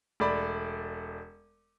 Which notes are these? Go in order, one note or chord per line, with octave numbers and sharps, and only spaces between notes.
E1 A3 D5 B5